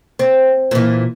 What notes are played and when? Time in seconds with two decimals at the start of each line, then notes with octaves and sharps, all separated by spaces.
0.19 C4
0.71 A#2 E3